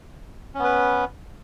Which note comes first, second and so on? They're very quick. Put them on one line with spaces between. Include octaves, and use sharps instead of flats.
C#4 B3 B4